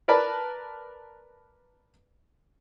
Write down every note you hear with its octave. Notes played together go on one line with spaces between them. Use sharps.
A#4 B4 D5 A5 B5